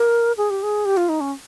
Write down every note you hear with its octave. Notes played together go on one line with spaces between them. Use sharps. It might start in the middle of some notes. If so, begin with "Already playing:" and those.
Already playing: A#4
G#4
G4
G#4
G4
F4
D#4
C#4